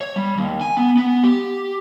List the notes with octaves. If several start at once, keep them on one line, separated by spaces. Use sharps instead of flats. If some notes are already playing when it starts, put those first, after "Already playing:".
C#5
G3
D#2
G#5
B3
B3
G4